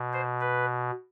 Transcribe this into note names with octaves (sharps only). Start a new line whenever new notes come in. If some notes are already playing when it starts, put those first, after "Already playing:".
Already playing: B2
C5
B4